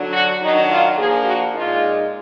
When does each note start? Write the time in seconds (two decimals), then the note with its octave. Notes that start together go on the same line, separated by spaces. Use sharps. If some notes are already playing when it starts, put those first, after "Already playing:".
Already playing: D3 F#3 D4
0.13 F#4
0.40 D#3 F#3 D4 D#4
0.69 F4
0.97 F3 A#3 D4 G#4
1.25 F#4
1.53 A#2 G#3 D#4 F4